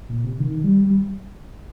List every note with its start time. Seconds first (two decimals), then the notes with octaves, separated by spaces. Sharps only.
0.09 A#2
0.24 C3
0.39 D#3
0.64 G3
0.87 G3